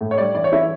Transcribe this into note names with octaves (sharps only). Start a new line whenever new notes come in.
A2
C#5
G3 D5
E3 D5
C#5
E3 E4